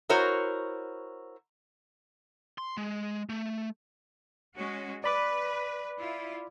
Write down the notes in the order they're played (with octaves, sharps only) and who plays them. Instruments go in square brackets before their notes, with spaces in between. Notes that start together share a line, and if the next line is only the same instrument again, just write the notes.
[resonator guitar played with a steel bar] E4 F#4 A#4 C5 C#5
[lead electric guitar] C6
G#3
A3
[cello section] G#3 C#4 F#4
[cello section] B4 [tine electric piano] D5 B5 D6
[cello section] E4 F4